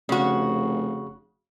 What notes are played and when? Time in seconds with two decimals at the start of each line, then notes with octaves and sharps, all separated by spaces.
0.09 F1 C#3 F#4